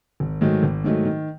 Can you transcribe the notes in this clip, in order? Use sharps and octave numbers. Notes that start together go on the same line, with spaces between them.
G#1
G#2 D#3 F#3 A3
G#1
G#2 D#3 F#3 A3
D#3